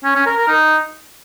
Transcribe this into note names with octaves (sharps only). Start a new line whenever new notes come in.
C#4
C#4
A#4
A#4
D#4